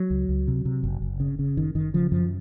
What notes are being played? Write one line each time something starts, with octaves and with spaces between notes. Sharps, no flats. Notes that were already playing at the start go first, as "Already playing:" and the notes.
Already playing: F#3
C#2
C#2
C3
C3
F#1
F#1
C#3
C#3
F#1 D#3
F#1 D#3
C#3 F3
F#2 F3